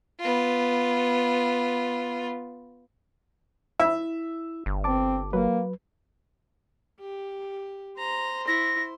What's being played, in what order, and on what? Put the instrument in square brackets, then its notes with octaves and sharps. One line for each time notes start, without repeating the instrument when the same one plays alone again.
[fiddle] B3 F4
[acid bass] E4 [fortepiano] E5
[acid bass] G1
[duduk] C4 [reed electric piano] A5 D6
[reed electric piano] F#3 B4 [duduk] A#3
[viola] G4
[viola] C5 [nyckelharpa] A#5
[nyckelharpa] E4 [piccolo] A#6